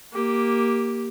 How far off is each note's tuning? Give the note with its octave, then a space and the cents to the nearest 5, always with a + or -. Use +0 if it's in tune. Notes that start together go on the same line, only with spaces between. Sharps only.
A#3 +0 G4 +0